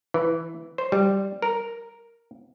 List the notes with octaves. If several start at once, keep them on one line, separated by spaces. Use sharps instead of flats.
E3
C5
G3
A#4